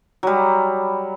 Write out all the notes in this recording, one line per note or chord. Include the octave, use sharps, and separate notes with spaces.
F#3 G3